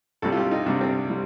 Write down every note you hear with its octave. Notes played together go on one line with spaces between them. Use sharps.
C2 C3 G3 A4
F4
G4
D#4
C2 C3 G3 D4
C4
G3